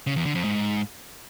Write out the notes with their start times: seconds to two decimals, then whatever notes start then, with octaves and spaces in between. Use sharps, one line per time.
0.07 C#3
0.16 E2
0.26 D3
0.35 F2
0.44 G#2